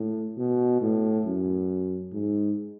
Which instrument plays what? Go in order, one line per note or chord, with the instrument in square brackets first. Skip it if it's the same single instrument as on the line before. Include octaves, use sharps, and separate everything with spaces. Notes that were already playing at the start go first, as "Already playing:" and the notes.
Already playing: [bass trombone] A2
B2
A2
F#2
G#2